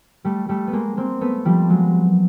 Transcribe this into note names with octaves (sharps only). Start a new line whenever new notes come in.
G3 A3
G3 A3
B3
G#3 A#3
A#3 C4
A3 B3
F3 G3
F#3 G#3